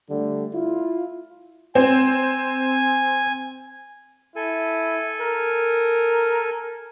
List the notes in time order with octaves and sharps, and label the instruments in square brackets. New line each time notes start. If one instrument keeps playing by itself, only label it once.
[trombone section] D3 G3 A3
E4 F4
[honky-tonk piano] C4 [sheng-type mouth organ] G#5
[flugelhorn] E4 [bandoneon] A4 G#5
[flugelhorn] A#4